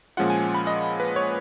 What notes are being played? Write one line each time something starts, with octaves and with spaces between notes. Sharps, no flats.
A#2 F3 G#3 C#4 F4 F#5
G#5
B5
D#5
B4
C#5